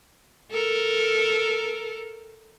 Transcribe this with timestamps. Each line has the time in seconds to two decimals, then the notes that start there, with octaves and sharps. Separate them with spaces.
0.51 A4 A#4